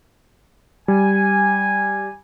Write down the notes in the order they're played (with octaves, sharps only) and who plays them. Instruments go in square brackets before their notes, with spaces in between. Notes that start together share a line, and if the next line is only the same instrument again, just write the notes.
[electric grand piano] G3 [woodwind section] G#5